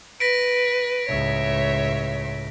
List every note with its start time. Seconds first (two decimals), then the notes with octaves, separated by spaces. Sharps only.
0.20 B4 A#6 B6 D7
1.08 C#2 A2 C#5 E5